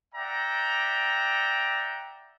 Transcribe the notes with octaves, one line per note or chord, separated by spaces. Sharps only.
D5 E5 F#5 G5 A#5